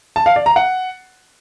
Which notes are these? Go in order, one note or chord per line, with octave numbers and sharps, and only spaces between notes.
A5
F5
D5
A#5
F#5